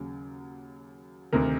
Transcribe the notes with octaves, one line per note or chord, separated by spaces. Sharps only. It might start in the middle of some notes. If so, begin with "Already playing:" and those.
Already playing: D#2 C#3 F#3
D2 C3 D#3 A#4